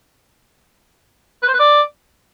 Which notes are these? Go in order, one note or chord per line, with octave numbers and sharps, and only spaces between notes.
B4
C5
B4
D5